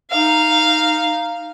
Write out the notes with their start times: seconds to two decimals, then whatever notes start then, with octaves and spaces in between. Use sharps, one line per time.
0.11 D#4 F5